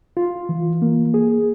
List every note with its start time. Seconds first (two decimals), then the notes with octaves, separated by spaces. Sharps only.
0.17 F4
0.49 E3
0.82 A#3
1.14 G#4